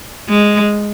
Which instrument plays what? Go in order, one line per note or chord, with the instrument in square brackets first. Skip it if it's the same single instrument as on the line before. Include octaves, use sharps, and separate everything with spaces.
[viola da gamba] G#3